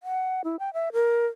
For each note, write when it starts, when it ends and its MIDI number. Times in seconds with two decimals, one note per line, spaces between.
0.03 0.42 78
0.44 0.56 64
0.59 0.73 79
0.73 0.89 76
0.93 1.26 70